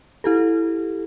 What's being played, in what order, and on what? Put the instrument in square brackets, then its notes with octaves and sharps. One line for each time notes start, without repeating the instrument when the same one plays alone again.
[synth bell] E4 G4 A4